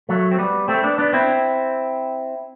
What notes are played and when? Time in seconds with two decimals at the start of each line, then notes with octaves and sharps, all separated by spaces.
0.09 F#3 A3
0.31 C4
0.39 G3 B3
0.68 A3 C4
0.83 B3 D4
0.98 B3 D4
1.13 C4 E4